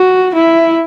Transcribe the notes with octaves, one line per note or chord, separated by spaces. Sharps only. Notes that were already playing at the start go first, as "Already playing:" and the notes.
Already playing: F#4
E4